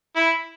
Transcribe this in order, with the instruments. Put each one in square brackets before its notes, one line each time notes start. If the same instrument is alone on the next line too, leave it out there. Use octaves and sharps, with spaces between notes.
[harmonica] E4